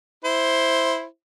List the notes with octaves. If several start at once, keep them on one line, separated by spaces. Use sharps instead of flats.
E4 C5